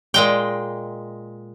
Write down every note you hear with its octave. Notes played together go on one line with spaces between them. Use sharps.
A#2 G#3 G5